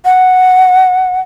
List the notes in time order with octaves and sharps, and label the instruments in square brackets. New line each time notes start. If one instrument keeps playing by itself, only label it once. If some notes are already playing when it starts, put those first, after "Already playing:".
[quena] F#5